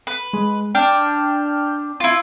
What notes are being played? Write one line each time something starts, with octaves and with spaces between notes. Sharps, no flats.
B4
G#3
D4 G5 F6 G6
E4 F4